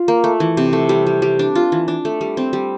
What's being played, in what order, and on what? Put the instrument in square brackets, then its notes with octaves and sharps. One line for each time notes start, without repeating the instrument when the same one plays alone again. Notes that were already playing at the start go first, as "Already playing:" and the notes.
Already playing: [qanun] F4
A#3
A3
E3
C3
A3
G3
G3
G3
D4
F4
E3
D4
A3
G3
C4
G3